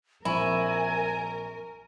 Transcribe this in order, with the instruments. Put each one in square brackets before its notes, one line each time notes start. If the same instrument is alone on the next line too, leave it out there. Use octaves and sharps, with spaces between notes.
[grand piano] A#1 C4 C#6 [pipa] E4 [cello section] A#4 [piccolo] G#5